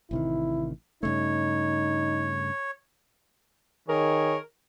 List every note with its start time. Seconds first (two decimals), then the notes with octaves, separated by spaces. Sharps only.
0.11 A1 C3 D#3 E4
1.03 G2 C#3 A3 D#4 C#5
3.88 D#3 G#4 A#4 C#5